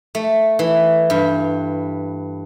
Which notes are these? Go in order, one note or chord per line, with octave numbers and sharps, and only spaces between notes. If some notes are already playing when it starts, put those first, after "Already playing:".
A3
E3
G2